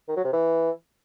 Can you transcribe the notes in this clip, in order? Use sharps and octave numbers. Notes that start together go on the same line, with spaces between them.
D#3
F#3
C3
E3